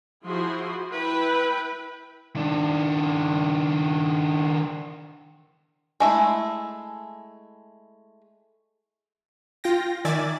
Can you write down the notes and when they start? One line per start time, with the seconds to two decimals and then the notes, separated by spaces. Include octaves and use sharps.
0.25 F3 E4 F#4 G#4 C6
0.92 E4 B4 G5
2.36 D#3 D4
6.00 G#3 A3 E4
9.64 F4 G5 A#6
10.05 D#3 D5 E5 G#5 D6 A6